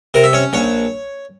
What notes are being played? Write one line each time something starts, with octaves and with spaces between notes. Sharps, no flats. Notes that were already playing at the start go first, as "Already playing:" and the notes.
C3 A#4
E5
C#4 C#5
A#1 C#5